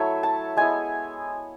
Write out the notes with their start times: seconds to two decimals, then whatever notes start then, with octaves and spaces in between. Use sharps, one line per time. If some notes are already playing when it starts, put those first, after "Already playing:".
Already playing: F#3 A3 E4 C#5 E5
0.23 A5
0.57 G#3 B3 E4 G#5